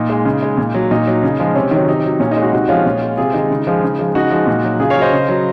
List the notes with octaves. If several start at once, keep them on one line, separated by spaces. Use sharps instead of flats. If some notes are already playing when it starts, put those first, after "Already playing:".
Already playing: A#2 D#4
G#3
C#3
G#3
A#2
F#3
A#2 D#4
F#3
C#3
F3 G#3
C3 C#4
D#3
F#3
C3 D#4
F#3
A#2 C#4
D#4
G#3
D#4 F#4
C3 D#4 F#4
F3 G#3 C#4 F4
A#2
G#3
C3 F4 G#4
D#3 G#3 D#4
C#3
F3 G#3
C#3
F3 G#3
C#3 D#4 F#4
F3 G#3
A#2
F#3
C#3 F4 G#4
C#5 F5
F#3
C5 D#5
C#3
F#3